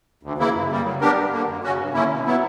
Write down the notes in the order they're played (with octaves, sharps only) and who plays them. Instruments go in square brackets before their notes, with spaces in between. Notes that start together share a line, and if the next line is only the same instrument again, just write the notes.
[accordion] D2
C#3 E3 A#3 E4
F#2
C#3 G3 A#3
F#3
B3 D4 G4 A#4
G2
D3 A#3
F#2
C#3 F#3 C#4 F#4
G2
D3 A#3 C#4 E4
B2
F#3 B3 E4